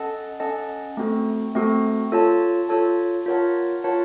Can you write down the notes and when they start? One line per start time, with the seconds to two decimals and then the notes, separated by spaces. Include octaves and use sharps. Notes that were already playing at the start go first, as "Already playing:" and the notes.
Already playing: C#4 A4 D#5 F#5 A5
0.40 C#4 A4 D#5 F#5 A5
0.97 A3 C4 F#4 A4
1.55 A3 C4 F#4 A4
2.12 F4 A4 C#5 A5
2.69 F4 A4 C#5 A5
3.26 F4 A#4 C#5 F#5 A5
3.84 F4 A#4 C#5 F#5 A5